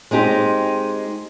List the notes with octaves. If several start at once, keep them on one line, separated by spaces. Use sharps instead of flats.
G#3 C4 D#4 G4